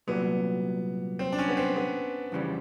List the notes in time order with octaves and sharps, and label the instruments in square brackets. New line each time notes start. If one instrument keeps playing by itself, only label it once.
[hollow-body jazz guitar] C2 A#2 F#3 [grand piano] B3
[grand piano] C4
D4
C#4
B3
C4
B3
[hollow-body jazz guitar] F2 C#3 E3 G3